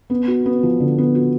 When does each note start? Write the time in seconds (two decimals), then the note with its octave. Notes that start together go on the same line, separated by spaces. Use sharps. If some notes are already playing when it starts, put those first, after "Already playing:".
0.10 B3
0.28 F#4
0.46 B3
0.63 F3
0.80 D3
0.98 B3
1.15 F#4